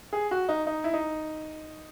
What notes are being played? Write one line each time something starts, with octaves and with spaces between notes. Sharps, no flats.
G#4
F#4
D#4
D#4
E4
D#4